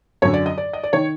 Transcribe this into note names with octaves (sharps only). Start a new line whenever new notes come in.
F#2 D3 C#5
D5
D#5
D5
D#5
D5
D#3 C#5